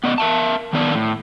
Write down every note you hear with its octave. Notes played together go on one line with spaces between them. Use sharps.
B3 D5 D#5
A#4 E5 A5
D#3 B3 D5 A5
A2